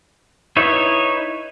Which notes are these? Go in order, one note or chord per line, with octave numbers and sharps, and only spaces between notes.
D#4 E4 B4 C#5 E5